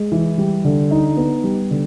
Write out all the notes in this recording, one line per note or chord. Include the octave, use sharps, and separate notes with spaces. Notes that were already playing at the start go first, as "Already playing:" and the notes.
Already playing: G#3
E3
G3
D3
D#4
B3
G3
D3